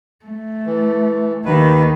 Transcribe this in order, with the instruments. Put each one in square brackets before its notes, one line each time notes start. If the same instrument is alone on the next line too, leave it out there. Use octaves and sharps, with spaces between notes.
[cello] A3
[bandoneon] E3
[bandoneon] D#2 B4 [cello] D#3